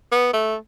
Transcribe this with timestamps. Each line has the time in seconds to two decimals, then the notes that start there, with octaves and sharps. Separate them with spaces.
0.12 B3
0.33 A3